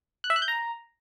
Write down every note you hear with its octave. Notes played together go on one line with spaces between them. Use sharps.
F#6
E5
F#6
G6
A#5